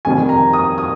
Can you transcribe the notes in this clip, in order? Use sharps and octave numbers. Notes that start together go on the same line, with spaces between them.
F2 C3 D#3 G3 G#5
A#5
D#6
D#6